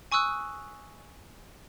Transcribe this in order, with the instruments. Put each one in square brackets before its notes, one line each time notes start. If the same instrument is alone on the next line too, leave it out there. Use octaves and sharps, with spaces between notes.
[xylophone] G#5 C#6 D#6 E6 F#6